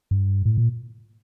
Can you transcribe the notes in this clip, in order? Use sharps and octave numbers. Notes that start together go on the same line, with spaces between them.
G2
A2
A#2